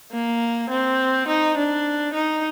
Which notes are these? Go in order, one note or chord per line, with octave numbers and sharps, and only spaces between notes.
A#3
C4
D#4
D4
D#4